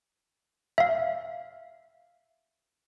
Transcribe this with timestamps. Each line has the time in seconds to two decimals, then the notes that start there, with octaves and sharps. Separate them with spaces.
0.78 E5 F5